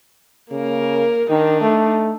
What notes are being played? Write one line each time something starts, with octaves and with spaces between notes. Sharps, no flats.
C#3 A#3 A#4
D#3 D4 D#4
A3